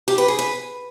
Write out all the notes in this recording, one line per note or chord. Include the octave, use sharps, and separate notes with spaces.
G4
B4
G#4
B4